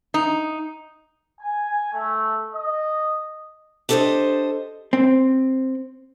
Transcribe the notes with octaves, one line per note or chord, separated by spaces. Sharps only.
D#4
G#5
A3
D#5
D4 G4 A4 B4 C5 D#5
C4